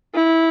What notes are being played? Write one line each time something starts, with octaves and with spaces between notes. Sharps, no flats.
E4